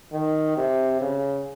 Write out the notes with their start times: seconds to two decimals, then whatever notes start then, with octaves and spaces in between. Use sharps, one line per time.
0.13 D#3
0.57 C3
1.01 C#3